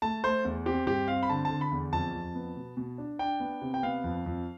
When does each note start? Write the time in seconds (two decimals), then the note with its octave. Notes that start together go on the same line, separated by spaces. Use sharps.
0.02 A3 A5
0.24 A3 C5
0.45 E2
0.66 C4 G4
0.87 G2 G4
1.08 C4 F5
1.23 B5
1.29 D3 A5
1.45 D3 A5
1.61 B5
1.71 E2
1.92 F2 A5
2.14 F2
2.35 B3
2.56 B2
2.77 B2
2.98 D4
3.19 D4 G5
3.40 B3
3.61 C3
3.74 G5
3.83 B3 F5
4.04 F2
4.26 F2